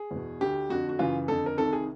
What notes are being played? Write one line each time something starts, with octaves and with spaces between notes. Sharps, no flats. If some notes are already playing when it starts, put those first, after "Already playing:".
Already playing: G#4
E2 B2
D2 D3 G4
F2 D3 F#4
F#4
F#2 C#3 E3 F4
F2 D3 A4
A#4
C2 C3 D#3 A4
G#4